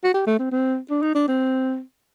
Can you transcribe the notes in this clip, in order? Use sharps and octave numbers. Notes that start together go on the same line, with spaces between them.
F#4
G4
A3
C4
C4
D4
D#4
D4
C4